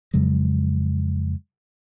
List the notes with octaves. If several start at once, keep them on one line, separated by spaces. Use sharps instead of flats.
F2 C#3 F#3 G#3